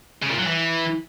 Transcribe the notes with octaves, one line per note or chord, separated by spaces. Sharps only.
C#3
A#2
F#3
E3